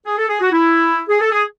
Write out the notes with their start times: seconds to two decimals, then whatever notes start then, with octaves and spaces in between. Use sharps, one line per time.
0.06 G#4
0.17 A4
0.29 G#4
0.41 F#4
0.52 E4
1.09 G#4
1.21 A4
1.31 G#4